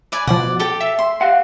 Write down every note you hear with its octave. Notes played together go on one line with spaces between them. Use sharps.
B4 D5 G#5
B2 F3 D5 F#5
G4 A4 G5
E5
C6
G4 F5 F#5